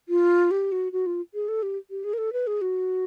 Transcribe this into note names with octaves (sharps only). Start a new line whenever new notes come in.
F4
G4
F#4
F#4
F4
G#4
A4
G4
G4
G#4
A#4
A4
B4
G#4
F#4